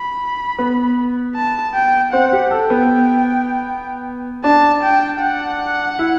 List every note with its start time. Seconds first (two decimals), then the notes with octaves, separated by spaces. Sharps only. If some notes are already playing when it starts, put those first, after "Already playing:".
Already playing: B5
0.59 B3
1.35 A5
1.74 G5
2.13 C4 F#5
2.32 G4
2.51 A4 G5
2.70 B3
4.44 D4 A5
4.83 G5
5.22 F#5
5.99 E4